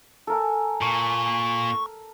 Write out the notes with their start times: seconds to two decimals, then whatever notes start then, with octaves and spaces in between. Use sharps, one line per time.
0.27 A4 A#4 G#5
0.82 A#2 C#6